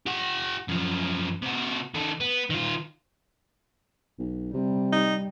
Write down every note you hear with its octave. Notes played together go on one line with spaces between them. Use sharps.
G4 F#5
F#2 F3
C3 F#4
D#3 A4
B3
D#3 F4
B1
C3 G3
D#4